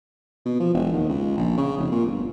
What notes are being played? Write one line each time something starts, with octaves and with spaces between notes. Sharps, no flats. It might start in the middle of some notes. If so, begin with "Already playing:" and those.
B2
F3
E1
D#2
C#2
A#1
C#3
F1
A#2
G1